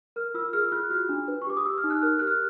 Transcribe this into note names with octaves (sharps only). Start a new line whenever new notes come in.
A#4 F6
F4 E6
G#4 F6
F4 F#6
F#4 F6
D4
B4
C#6
G4 D6
D#6
G4 E6
F6
D#4
F#6
A#4 F6
G4 F#6
F6